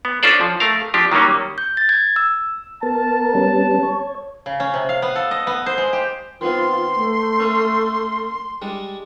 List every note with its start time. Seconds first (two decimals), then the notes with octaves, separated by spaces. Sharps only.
0.05 B3
0.23 C#4 D4 F4 A4 C5 D5
0.41 F3
0.60 A3 A#4 F5
0.94 F3 C4 D4 G4
1.12 D#3 F#3 G3 A#3 C#4
1.58 G6
1.77 A6
1.89 G#6
2.16 E6
2.83 B3 A#4 A5
3.35 G3 B3 C#4
3.83 C#5
4.46 C#3
4.60 C#4
4.74 C3
4.89 F5
5.02 B3
5.16 A4
5.31 D#5
5.47 B3
5.66 C5
5.78 G#3
5.93 G4
6.41 D#3 B3 C4 F4 C6
6.96 A3
7.40 A#3 C#4
8.62 G3 G#3 D4